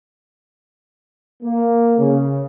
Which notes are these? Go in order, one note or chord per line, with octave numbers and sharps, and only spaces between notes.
A#3
C#3